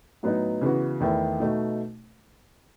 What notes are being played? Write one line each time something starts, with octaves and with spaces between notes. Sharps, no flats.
A2 F#3 B3 D#4
C#3 E3 B3 F#4
E2 D#3 A3 E4
B2 A3 D#4 F#4